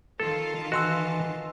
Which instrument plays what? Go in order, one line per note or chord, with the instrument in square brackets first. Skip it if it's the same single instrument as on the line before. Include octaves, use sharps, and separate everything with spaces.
[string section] D#3 F4 A5 [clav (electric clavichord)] A4
[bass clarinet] E3 [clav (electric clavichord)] F#4 [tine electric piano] D#5 C6 E6